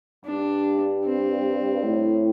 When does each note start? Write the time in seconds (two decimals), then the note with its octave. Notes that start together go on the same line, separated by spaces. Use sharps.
0.25 G2 D4
1.04 C4
1.84 A2